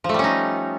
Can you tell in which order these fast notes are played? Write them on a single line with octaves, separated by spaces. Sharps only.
F3 A3 G3 C#4 D#4